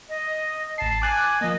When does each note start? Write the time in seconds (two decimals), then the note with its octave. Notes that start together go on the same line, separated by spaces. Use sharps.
0.09 D#5
0.78 A1 A5 C7
1.02 G#5 D6 F#6 A6
1.41 F3 A#3 D#5